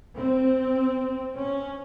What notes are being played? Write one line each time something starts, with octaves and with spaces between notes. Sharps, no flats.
C4
C#4